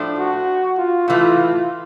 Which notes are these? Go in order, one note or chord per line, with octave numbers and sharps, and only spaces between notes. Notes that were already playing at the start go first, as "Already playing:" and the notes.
Already playing: A2 F3 A3 D4
F#4
F4
A2 E3 A3 F4